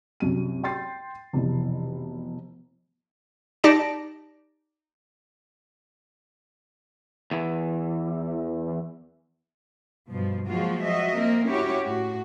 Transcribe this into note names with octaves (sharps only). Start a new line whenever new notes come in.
C2 F#2 D#7
G5 C6 A6 C7
F1 B2 E3
D#4 G4 D5 A5 A#6 D7
E2 E3
G2 B2 F3
F3 F#3 G#3 A#3 F4 F#4
F3 F#3 F#4 D#5 E5
A#3 C4 A#4
C#4 E4 F#4 G4 C#5
A2 F#4